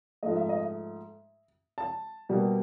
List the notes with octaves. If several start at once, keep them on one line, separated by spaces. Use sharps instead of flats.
G#2 F3 A3 D#5
E5
D#5
E5
A5
B2 G3 A#3